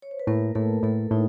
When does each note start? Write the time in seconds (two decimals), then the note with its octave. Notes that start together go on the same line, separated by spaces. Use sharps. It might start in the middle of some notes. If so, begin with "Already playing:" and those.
0.02 C#5
0.11 C5
0.19 B4
0.27 A2 A#3 A#4
0.55 A2 A3 A4
0.83 A2 A3 A4
1.11 A2 D#4